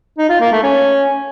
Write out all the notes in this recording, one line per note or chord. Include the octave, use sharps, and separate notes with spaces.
D#4
F4
A#3
A3
C#4